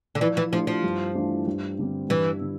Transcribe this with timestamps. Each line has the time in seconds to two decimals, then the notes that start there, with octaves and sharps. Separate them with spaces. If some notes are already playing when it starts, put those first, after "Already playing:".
0.15 D3
0.20 E3 F3
0.37 E3
0.52 F3 A3 D4 G4
0.67 F3
0.83 G2
1.15 E3 A3 D4 F4
1.47 G2
1.79 D3 G3 C4
2.09 G2 E3
2.41 D3